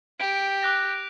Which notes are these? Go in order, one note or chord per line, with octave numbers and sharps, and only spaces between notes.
G4 D7
D6 F#6 A#6